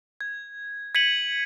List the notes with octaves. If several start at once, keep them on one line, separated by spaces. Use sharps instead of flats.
G#6
G#6 B6 C#7 D#7 F#7